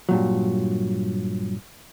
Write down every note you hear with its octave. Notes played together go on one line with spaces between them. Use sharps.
G2 A#2 F#3